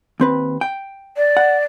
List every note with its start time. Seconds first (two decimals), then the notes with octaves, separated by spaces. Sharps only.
0.20 D#2 C4 B4
0.61 G5
1.17 D5
1.37 F#5